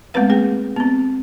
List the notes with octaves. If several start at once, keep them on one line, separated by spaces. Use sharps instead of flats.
G#3 A3 B3 C4 B4 F5
A#3 G#4 G5
B3 C4